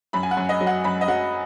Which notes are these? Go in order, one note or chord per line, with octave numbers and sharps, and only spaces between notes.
F#2 B5
G#5
F#5
F#2
D#5
F#3
F#5
F#2 B5
D#5
F#3 F#5